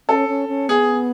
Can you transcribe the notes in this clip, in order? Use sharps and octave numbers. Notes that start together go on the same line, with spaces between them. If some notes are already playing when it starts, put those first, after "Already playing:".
C#4 A4
C#4
C#4
B3 G#4